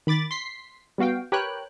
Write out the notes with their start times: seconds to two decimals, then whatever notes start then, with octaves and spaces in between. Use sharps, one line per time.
0.07 D#3 B5 D6 A6
0.31 C6 B6 C7
0.98 G3 B3 F#4 F5 G5
1.32 G4 A#4 B4 C#5 G5 F#6